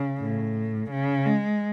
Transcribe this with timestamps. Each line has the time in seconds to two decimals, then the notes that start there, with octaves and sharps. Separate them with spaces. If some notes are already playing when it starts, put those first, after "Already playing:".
Already playing: C#3
0.21 A2
0.91 C#3
1.26 G#3